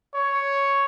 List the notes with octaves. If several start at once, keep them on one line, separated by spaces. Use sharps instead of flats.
C#5